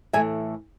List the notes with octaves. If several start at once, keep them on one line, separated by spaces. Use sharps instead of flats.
A2 E3 A3 E5 G#5